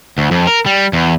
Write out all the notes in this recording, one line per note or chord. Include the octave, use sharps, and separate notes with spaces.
D2
F2
A#4
G3
E2